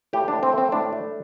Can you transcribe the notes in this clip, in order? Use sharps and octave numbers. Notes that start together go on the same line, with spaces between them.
A2 G4
A2 D4
C4
A3 C4
A2 D4
A3